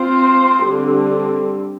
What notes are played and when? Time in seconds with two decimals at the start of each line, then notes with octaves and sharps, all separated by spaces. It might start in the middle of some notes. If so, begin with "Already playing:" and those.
Already playing: C4 F4 C5
0.64 D3 G3 C4